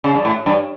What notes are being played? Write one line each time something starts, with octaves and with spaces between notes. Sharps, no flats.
C#3
G2
A2
G2